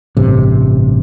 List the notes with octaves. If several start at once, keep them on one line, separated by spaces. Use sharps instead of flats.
A1 G2 C3